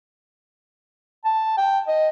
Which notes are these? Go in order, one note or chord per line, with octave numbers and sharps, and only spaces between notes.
A5
G5
D#5